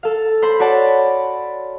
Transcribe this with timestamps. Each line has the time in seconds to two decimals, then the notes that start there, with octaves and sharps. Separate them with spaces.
0.03 A4 F5
0.42 C5 B5 C6 B6
0.60 F#4 C#5 D5 F#5 A5 B5